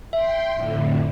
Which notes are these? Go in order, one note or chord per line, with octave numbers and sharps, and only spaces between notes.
E5 G5 C6
F2 A2 D3